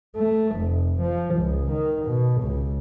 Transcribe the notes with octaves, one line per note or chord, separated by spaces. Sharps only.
A3
F1
F3
C#2
D#3
B2
C#2